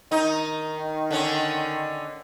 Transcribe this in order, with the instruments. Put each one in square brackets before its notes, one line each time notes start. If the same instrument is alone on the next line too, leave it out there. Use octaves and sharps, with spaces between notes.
[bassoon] D#3 [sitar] D#4
[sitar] D3 C#4